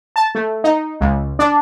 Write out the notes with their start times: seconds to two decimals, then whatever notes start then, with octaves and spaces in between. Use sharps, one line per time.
0.16 A5
0.35 A3
0.64 D#4
1.01 C#2
1.39 D4